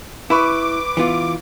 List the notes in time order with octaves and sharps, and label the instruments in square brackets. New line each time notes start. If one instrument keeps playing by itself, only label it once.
[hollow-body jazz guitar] E4 [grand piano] B4 B5 C#6 [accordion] D6
[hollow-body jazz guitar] E3 B3 F4